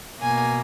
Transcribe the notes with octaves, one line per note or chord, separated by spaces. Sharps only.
B2 A#3 G#5